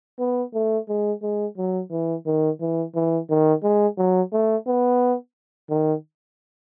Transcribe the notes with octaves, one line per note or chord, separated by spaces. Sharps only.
B3
A3
G#3
G#3
F#3
E3
D#3
E3
E3
D#3
G#3
F#3
A3
B3
D#3